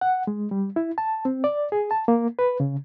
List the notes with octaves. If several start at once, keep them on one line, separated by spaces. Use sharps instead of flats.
F#5
G#3
G3
E4
A5
C4
D5
G#4
A5
A#3
B4
C#3